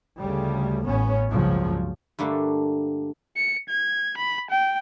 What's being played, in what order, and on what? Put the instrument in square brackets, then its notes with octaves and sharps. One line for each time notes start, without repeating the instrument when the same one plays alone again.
[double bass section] D2 C#3 G3
A1 B3 C#4
C#2 G2 A#2 C#3 F3 F#3
[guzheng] G2 D3 A3 A#3 G4
[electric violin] C#7
G#6
B5
G5